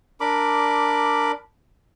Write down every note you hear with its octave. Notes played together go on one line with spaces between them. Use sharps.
D4 A#4 B5 D6